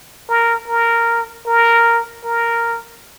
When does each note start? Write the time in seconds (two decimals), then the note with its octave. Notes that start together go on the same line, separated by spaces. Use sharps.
0.29 A#4
0.68 A#4
1.46 A#4
2.25 A#4